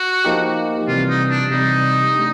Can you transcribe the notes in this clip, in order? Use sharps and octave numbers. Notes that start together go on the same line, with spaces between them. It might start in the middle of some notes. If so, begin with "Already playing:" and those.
Already playing: F#4
F3 A#3 D#4 G4
C3 E3 G3 F4
D#4
D4
C3 E3 G3 D#4
A3 D4 G4